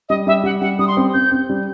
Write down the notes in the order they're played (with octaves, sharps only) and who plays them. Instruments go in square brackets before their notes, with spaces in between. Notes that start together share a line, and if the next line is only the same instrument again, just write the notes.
[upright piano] G3 [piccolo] D#5
[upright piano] G3 [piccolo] E5
[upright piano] G3 [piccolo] F#5
[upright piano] G3 [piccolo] F#5
[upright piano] G3 [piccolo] D#6
[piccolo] C6
[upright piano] C4
[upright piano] C4 [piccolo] G6
[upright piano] C4
G3